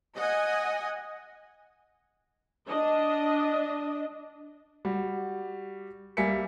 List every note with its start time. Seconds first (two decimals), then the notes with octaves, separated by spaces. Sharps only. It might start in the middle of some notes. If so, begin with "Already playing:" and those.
0.15 D#5 F#5 G#5
2.67 D4 D#5
4.85 G3 F#4
6.17 G3 A#3 E5 G#5 B6 C#7